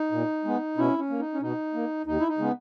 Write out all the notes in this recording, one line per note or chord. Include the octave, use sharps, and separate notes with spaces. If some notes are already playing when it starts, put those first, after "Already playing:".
Already playing: D#4
A#2
G#3 B3
B2 C#4 E4
C#4
A#3
D#4
C#4
B2 D#4
A#3
D#2 D#4
E4
D#4
C#3 G#3 B3